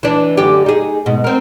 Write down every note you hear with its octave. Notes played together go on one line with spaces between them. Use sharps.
E3 D4
F#2 D3 G4
D#4 G#4
G#2 B2
C4 A#4